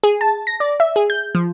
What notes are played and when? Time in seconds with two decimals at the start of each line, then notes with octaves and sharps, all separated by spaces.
0.04 G#4
0.21 A5
0.47 A#6
0.60 D5
0.80 E5
0.96 G#4
1.10 G6
1.35 F3